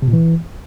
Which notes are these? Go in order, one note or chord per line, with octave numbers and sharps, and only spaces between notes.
C3
A#2
E3